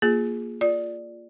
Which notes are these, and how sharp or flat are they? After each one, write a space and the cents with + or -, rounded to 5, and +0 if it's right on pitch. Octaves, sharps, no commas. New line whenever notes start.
A#3 +0 F4 +20 G#4 +0
F4 +0 D5 +0